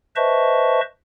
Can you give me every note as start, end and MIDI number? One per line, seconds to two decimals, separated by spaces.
0.16 0.81 71
0.16 0.81 72
0.16 0.81 75
0.16 0.81 76
0.16 0.81 81
0.16 0.81 85